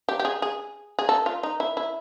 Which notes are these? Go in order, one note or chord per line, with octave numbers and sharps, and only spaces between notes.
G4
G4
G#4
G#4
G#4
A4
F4
D#4
E4
E4